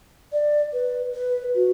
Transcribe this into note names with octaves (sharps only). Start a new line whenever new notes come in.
D5
B4
B4
F#4